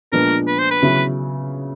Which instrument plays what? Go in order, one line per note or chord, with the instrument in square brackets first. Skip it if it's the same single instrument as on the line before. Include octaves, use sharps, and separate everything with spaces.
[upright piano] A#2 F3 G#3 B3 D4 [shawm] A#4
[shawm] B4
C5
B4
[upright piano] C#3 F#3 B3 E4